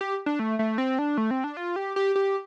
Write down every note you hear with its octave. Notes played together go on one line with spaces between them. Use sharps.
G4
D4
A3
A3
C4
D4
A3
C4
D4
F4
G4
G4
G4